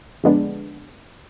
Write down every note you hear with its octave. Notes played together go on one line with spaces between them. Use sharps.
F2 D3 G#3 B3 D4